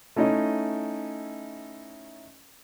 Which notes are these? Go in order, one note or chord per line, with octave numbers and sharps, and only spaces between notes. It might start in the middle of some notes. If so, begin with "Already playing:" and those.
A3 C#4 D#4 E4 D#5